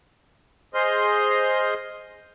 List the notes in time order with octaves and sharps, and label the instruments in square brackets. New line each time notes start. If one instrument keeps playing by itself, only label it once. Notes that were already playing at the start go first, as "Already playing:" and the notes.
[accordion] G#4 C5 D#5 C6 F6